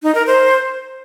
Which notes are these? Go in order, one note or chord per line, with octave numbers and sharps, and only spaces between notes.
D#4
A#4
C5